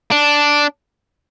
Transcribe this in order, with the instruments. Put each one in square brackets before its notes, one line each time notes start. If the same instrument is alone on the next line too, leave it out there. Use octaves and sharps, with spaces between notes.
[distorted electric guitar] D4